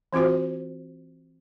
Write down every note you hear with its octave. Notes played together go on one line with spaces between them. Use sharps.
E3 C4 F4 F#4 C5